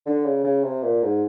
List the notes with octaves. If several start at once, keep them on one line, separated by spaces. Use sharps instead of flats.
D3
C#3
C#3
C3
A#2
G#2